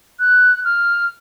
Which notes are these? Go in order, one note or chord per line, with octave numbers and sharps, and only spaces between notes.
F#6
F6